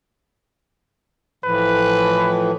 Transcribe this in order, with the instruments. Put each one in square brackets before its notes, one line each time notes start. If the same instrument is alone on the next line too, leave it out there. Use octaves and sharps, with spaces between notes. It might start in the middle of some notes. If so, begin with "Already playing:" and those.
[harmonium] A2 E3 F3 [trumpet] B4